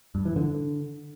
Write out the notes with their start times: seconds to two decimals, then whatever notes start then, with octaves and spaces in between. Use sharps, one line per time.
0.15 G2
0.25 E3
0.36 D3